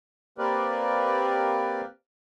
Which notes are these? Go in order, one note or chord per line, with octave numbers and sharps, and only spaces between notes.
A#3 C4 G4 A#4 B4 D5